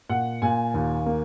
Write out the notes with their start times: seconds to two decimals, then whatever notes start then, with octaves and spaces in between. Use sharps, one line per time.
0.09 A#2 F#5
0.42 A#2 G#5
0.74 D#2
1.06 A#3